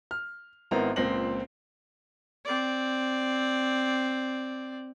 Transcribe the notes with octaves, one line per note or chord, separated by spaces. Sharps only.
F6
G#1 B3 C4 E4 A#4 A#5
C#2 A#2 C4 A#6 F#7
C4 D5